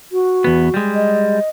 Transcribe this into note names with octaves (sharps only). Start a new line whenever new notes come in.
F#4
E2 B3
G3 G#3
D#5